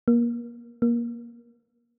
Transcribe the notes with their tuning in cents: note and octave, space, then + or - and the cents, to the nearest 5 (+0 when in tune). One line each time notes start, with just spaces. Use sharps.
A#3 +25
A#3 +20